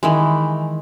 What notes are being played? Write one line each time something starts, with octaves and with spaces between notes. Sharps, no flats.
D#3 E3 G#3